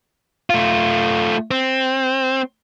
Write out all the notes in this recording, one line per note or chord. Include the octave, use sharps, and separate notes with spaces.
A3 F4
C4